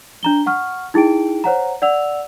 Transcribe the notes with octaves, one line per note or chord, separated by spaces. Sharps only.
D4 A#5 G7
F#5 C#6 F6
D#4 E4 G#4 G5 D7
C5 C#5 F#5 A#5
D5 F#5 E6 F7